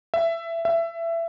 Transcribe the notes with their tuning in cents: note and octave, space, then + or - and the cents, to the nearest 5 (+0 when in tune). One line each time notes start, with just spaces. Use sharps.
E5 +15
E5 +20